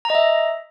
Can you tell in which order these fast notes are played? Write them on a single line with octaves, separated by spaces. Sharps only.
A#5 D#5 E5